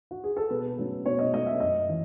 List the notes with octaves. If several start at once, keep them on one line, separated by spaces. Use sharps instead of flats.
F#4
G#4
A4
B2 B4
F#3 A3 C#4
B2 C#5
D#5
F#3 A3 C#4 D#5
E5
F#2 D#5
E3